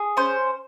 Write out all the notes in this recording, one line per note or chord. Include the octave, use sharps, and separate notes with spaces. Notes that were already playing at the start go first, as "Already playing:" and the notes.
Already playing: G#4
C#4 C5